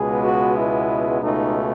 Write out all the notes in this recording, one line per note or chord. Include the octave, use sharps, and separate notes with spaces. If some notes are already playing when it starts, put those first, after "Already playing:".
Already playing: C#2 B2 G#3 B3 G#4
F#4
E4
C#2 B2 A3 D#4